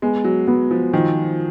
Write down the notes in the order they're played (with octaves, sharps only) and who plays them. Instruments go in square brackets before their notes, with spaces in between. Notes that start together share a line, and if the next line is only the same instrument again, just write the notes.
[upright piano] G#3 [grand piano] B3
[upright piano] F#3
[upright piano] F#3 [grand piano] B3
[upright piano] F3
[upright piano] D#3 [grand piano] F3